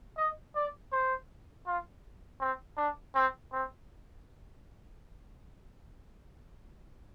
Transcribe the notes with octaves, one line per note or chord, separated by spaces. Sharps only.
D#5
D5
C5
F4
C4
D4
C4
C4